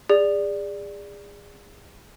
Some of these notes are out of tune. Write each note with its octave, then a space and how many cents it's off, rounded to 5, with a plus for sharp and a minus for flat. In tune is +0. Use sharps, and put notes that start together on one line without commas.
G#4 -30 D5 +0